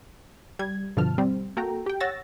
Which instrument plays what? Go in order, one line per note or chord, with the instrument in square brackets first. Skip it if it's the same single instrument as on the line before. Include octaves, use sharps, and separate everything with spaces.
[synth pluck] G3 G#6
G2 B2 D3 F3 A5 F6
G3 C4
A#3 F#4 A4 G5 A#5
G4 G5
C#5 F#5 E6 A6 A#6